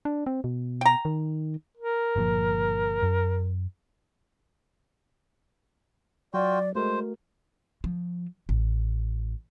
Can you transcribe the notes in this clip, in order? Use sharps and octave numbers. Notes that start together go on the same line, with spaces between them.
D4
C4
B2
G5 A#5
D#3
A#4
G1 A#2 F3
F#2
F#3 F4 F#4 D5 G5
G#3 A3 F#4 A#4 C5
F3
A1